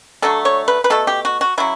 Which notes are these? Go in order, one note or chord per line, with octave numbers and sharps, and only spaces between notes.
D3 F#3 A3 A4
C#5
B4
B4
B2 A3 A4
G4
F#4
F#4
C#3 F#3 E4